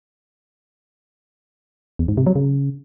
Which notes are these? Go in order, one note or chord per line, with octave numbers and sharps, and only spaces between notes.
E2
G#2
C3
F#3
C#3